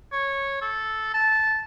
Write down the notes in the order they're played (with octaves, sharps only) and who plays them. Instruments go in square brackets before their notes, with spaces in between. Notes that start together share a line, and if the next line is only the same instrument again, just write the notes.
[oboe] C#5
A4
A5